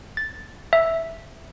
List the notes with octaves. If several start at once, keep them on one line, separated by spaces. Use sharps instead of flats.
A6
E5